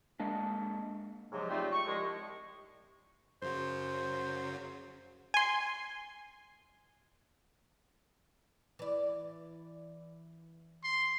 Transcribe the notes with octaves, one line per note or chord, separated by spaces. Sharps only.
G#3 A#3 D4
G#2 C3 F3 F#3 G#3
G3 A3 C4 D#4 F4
C#6
C2 F3 G#3
F#2 C#3 F#3 C5
G#5 C6
E3 D5
C6